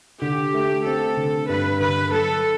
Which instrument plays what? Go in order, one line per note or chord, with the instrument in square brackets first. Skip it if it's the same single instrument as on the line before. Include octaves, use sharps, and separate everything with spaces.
[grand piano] D3 [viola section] G4
[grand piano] A3
[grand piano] C4 [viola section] A4
[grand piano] D3
[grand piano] G2 [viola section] B4
[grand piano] D3 [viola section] B4
[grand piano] F#3 [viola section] A4